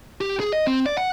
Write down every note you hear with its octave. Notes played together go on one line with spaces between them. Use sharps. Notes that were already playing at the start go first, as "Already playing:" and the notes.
G4
G#4
D#5
C4
D5
F#5